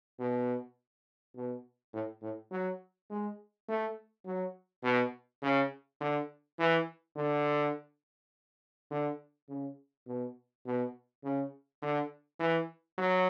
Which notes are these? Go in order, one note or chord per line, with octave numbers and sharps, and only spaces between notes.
B2
B2
A2
A2
F#3
G#3
A3
F#3
B2
C#3
D3
E3
D3
D3
C#3
B2
B2
C#3
D3
E3
F#3